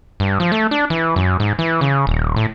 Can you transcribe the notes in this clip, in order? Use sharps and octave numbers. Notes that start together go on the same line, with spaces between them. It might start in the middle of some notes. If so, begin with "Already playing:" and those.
G2
F3
A3
D4
E3
F#2
G#2
E3
C#3
D#1
A2